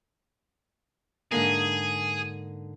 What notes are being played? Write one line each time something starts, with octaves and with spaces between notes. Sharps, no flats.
G#2 D3 A#3 G#4